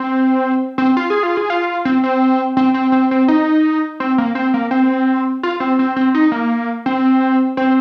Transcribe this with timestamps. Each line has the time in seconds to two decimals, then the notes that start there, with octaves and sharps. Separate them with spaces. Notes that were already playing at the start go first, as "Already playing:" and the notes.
Already playing: C4
0.78 C4
0.97 F4
1.10 G#4
1.23 F4
1.37 G#4
1.50 F4
1.85 C4
2.04 C4
2.57 C4
2.74 C4
2.92 C4
3.11 C4
3.28 D#4
4.00 C4
4.18 A#3
4.35 C4
4.54 A#3
4.71 C4
5.43 F4
5.60 C4
5.79 C4
5.96 C4
6.14 D#4
6.32 A#3
6.86 C4
7.57 C4